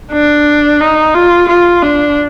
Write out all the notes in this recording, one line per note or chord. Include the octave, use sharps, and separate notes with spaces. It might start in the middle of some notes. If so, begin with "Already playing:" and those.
D4
D#4
F4
F4
D4